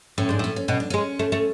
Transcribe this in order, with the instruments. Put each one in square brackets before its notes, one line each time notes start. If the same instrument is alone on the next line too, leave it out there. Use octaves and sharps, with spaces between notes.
[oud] A2 [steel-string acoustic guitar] C#4
[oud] G#2 [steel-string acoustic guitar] D4
[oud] A2
[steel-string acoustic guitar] C#4
C#4
[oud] B2 [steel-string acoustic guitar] C#4
[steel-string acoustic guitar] D4
[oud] G#3 [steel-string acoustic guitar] C#4
[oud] A3
A3